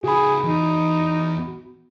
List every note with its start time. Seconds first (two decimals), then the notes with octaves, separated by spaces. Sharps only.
0.04 C#2 D#4 F#4 G#4 B5
0.44 E2 D#4